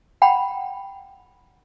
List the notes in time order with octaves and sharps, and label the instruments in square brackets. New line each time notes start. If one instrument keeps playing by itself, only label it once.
[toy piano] F#5 G5 A#5 B5